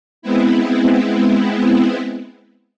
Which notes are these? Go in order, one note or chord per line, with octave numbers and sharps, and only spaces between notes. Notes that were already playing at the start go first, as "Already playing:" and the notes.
G#3 B3 C4 E4